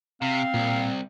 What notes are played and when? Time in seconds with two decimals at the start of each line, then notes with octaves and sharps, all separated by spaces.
0.22 C3 C4 F5
0.54 C2 A#2